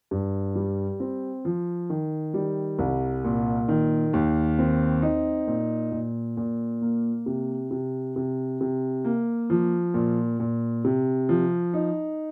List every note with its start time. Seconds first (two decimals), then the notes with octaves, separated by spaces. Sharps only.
0.11 G2
0.55 G3
1.00 C4
1.45 F3
1.90 D#3
2.34 G3
2.79 C2
3.24 A#2
3.68 D#3
4.13 D#2
4.59 C4
5.02 D#4
5.47 A#2
5.92 A#2
6.37 A#2
6.81 A#3
7.26 C3
7.71 C3
8.16 C3
8.61 C3
9.05 A#3
9.50 F3
9.94 A#2
10.40 A#2
10.84 C3
11.29 F3
11.74 D#4